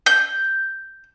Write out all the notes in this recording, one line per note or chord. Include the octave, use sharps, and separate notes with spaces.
G6